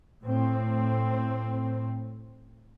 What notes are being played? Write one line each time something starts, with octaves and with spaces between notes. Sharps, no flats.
A2 C4